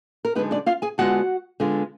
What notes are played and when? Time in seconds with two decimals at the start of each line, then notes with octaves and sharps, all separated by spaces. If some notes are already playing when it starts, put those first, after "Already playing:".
0.25 A#4
0.35 F#2 D3 G#3 B3 D#4 B4
0.51 D4 D5
0.66 F4 F5
0.82 G#4 G#5
0.98 D3 G#3 B3 F4 F#4 F#5
1.60 D3 G#3 B3 F4